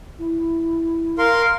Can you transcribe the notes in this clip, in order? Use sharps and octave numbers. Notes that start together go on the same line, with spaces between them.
E4
A#4 F5 C6